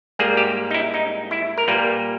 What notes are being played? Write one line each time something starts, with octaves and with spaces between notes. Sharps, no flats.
G#2 G3 A#3 G#4
G4
D#4
E4
D#4
E4
A#4
A#2 G3 A#3 B4